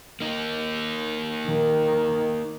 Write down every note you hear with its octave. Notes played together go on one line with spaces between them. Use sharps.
A#3 D#4
D#3